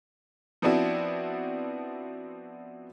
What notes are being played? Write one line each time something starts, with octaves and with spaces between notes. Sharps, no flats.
F3 B3 C4 D4 E4 F#4